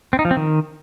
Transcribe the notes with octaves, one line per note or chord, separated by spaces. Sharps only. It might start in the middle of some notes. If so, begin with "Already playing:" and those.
C4
D#4
F3
C4
D#3